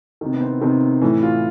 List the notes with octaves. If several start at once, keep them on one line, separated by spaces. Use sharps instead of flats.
C3 D#3
B3
C4
C3 D#3 C4
A2 E3 C#4
F4